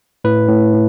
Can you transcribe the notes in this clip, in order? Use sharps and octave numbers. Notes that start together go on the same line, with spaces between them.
A2 B4
A2
A2